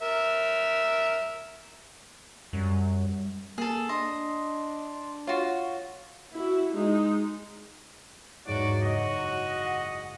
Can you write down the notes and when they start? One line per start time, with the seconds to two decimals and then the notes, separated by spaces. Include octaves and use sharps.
0.02 A#4 E5
2.53 F#2 G3
3.58 A#3 G#4 A4
3.89 D4 D#5 C6
5.27 F4 F#4 C#5
6.33 E4 F#4
6.73 G#3 D#4
8.47 E2 G#2 F#3 F#4 D5
8.82 F#1 F#4 D#5 D6
9.61 F#5 F#6 C7